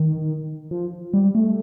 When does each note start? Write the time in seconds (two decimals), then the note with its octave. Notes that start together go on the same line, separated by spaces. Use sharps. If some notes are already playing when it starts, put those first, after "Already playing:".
Already playing: D#3
0.71 F3
1.14 G3
1.35 A3